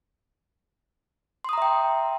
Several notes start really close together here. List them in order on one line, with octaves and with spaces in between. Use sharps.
C6 D#6 A#5 E5 G5